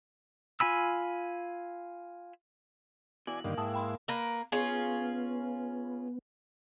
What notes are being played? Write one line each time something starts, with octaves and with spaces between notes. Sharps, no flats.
F4 G#5 B5 E6
B2 E3 D5 G#5 F#7
G2 D3 D#3 A#3
G#2 E4 G5 A5 D#6
G5 B5 C6
A#3 A#4 B4
B3 C#4 F4 G#4